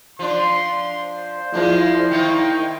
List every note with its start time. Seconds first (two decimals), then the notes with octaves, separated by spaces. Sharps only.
0.19 F3 D4 C6
1.02 C5
1.53 F3 G#3 A#3 D4 E4
2.11 D#3 A#3 D#4 G5